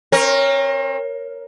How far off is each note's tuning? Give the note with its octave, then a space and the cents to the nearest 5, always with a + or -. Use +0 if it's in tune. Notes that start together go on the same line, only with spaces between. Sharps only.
C4 +40 A#4 +0 C#5 +0